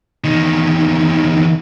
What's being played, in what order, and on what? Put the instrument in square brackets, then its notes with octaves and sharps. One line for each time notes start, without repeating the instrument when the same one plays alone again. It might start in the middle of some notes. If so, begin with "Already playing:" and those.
[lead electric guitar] E2 D#3